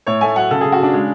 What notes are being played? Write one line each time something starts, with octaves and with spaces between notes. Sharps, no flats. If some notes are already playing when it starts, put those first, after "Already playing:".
A2 C#5
A3 G#5
F#3 F#5
C#3 A4
C#3 G#4
F#4
C#3 D4
G#3